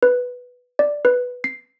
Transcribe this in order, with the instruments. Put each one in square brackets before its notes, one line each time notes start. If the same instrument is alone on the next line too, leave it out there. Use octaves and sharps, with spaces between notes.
[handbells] B4
D5
B4
C7